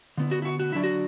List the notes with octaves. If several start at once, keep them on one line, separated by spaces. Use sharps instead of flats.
D3 B3 E4
F#4
E4
F#4
F#4
D3 F#3 D4 E4
F#4